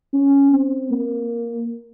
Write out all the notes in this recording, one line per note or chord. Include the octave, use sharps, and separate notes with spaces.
C#4
C4
A#3